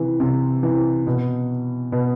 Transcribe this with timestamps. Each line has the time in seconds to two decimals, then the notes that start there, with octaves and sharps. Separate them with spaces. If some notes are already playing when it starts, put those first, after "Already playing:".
Already playing: C3 E3
0.20 C3
0.63 E3
1.07 B2
1.92 B2